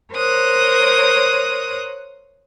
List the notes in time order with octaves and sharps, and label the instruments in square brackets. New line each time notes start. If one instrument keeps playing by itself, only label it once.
[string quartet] A#4 C5 C#5 D#6 F#6